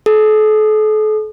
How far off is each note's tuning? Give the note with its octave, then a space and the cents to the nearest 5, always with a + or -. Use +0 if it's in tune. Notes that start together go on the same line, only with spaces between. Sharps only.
A4 -40